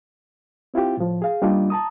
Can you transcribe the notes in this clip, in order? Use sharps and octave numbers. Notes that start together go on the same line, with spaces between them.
C4 E4 F4 G4
A2 F3
G#4 F5
G3 A#3 D4 D#4 F4
A5 A#5 D#6